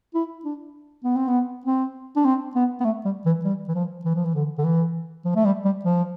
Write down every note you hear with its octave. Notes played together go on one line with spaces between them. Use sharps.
E4
D4
B3
C4
B3
C4
D4
C4
B3
B3
A3
G3
E3
G3
E3
F3
E3
F3
E3
D3
D3
E3
F3
A3
G3
G3
F3